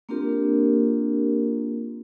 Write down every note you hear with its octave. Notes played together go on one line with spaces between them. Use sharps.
A#3 C4 D4 F4 G4 A#4